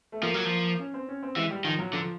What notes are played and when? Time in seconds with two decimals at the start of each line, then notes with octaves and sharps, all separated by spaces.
0.12 A3
0.23 F3 A#3
0.34 F#3
0.45 F3
0.80 C#4
0.94 C4
1.08 C#4
1.23 C4
1.36 E3 G#3
1.51 G3
1.65 D#3 F3
1.79 F#3
1.93 D3 F3